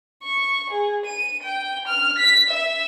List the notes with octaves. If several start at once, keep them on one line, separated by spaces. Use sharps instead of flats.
C#6
G#4
D#7
G5
F6
B6
E5